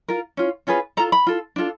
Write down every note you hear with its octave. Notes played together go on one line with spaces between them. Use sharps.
F4 A#4
C#4 F4
C#4 F4 G#4 B4
F4 A4 A#5
B5
F4 A4
D4 F4 A4